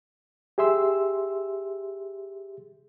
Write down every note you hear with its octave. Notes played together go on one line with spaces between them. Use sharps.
G4 G#4 E5 C6 E6